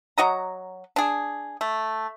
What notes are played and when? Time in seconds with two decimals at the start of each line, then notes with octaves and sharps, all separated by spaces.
0.18 F#3 F#4 D#5 A#5
0.96 D4 G#4
1.61 A3